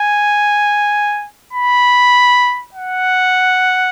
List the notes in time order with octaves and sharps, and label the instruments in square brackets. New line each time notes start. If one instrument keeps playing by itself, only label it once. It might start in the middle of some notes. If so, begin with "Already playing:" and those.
Already playing: [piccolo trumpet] G#5
B5
F#5